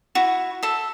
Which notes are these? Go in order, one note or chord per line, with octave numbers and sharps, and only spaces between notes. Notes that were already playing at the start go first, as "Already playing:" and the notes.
E4 F#4
A4 E5